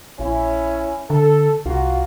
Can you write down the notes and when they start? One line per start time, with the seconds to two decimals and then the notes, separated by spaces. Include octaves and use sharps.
0.19 A#1 C#4 E4
1.10 D3 A4
1.66 C2 A#3 F4 F#4